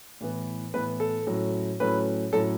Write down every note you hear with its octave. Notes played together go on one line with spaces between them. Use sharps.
A2 E3 B3
A2 E3 B3 B4
A4
A2 F#3 A3 C#4
A2 F#3 A3 C#4 B4
A2 F#3 C#4 A4